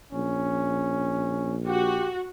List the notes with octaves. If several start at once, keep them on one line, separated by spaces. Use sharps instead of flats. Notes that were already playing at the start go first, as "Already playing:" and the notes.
A#1 C#4
F#4 G4